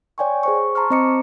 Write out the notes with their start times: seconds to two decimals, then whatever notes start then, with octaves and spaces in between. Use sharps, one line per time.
0.18 C#5 D5 G5 G#5 C6 C#6
0.43 G#4 C5 C#6
0.75 A5 A#5 C6 C#6 F6
0.90 C4 C5 D#5 A#5 D6 C#7